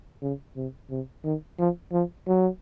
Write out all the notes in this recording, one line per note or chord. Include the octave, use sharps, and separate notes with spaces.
C#3
C3
C3
D#3
F3
F3
F#3